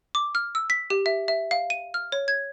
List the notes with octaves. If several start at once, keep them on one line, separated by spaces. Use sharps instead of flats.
D6
F6
E6
B6
G4
E5
E5
F5
D#7
F6
C#5
G#6